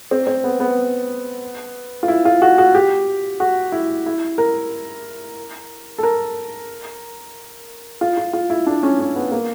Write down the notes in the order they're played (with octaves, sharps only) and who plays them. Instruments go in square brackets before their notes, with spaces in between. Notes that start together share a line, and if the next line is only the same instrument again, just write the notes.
[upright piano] C4
C4
B3
B3
F4
E4
F4
F#4
F#4
G4
F#4
E4
E4
A#4
A4
A#4
F4
F4
F4
E4
D4
C#4
C#4
B3
A#3